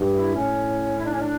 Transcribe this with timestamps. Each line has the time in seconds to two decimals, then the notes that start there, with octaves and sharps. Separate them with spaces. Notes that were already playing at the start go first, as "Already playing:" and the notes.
Already playing: G2
0.14 E4
0.34 A2 C#4
0.97 E4
1.05 D4
1.12 C#4
1.20 D4